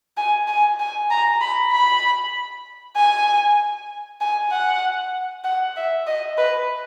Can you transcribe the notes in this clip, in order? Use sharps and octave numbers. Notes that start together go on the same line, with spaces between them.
G#5
G#5
G#5
A#5
B5
B5
G#5
G#5
F#5
F#5
E5
D#5
B4